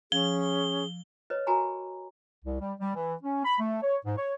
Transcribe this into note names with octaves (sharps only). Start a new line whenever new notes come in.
F3 C#4 G#4 G7
B4 C#5 D#5
F#4 A#4 G#5 A#5 B5 C#6
C2
G3
G3
E3
C#4
B5
A3
C#5
G#2
C#5